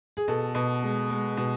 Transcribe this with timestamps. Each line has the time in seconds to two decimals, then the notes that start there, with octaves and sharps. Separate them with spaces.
0.17 G#4
0.28 B2 A4
0.55 B2
0.82 G#3
1.10 G#3
1.37 B2